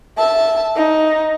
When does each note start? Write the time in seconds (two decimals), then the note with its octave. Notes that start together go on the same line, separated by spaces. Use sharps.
0.18 E5 A5
0.76 D#4